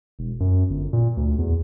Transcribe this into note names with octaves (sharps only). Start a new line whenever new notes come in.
E1
F#2
G1
A#2
D2
E2